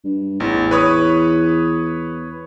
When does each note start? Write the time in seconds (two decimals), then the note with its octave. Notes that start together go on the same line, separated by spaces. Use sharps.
0.04 G2
0.40 A1 E2
0.71 B4 C#5 D#6